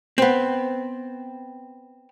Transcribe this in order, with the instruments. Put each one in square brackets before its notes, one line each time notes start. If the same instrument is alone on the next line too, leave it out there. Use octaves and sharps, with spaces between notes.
[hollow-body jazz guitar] B3 C4